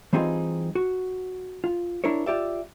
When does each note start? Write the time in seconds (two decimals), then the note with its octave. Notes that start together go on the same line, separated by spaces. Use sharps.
0.13 E3 G3 C4 D#4 F4 G#4
0.75 F#4
1.64 F4
2.04 D4 E4 A#4 C#5
2.26 F4 G4 D5 E5